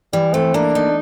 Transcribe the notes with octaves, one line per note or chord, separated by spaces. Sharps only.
E3 G3
A3 C4
A#3 D4
D#4